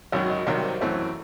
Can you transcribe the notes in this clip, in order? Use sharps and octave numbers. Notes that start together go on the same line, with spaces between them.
G#1 F#2 D#3 F#3 C#5
D#5
C2 C3 D#3 F#3 C#5
C5
F#2 E3 A3 C4 C#5